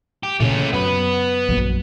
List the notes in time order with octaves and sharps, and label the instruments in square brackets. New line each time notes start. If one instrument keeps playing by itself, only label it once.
[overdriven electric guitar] G4
[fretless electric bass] A#2 C#3 [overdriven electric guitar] A3 C#4
[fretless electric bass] F#2 [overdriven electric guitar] B3 B4
[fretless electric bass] A#1 F#2